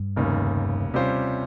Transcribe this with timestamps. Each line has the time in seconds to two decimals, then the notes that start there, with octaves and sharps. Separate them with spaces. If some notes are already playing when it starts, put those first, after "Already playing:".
Already playing: G2
0.16 F1 D#2 C#3
0.94 C3 G3 C#4 F4 C5